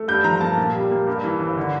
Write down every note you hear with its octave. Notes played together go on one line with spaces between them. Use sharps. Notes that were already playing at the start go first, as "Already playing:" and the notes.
Already playing: A3
G2 G6
F3 A#5
A#3 A5
A#2
G3
A#3
G2
E3
G1
D3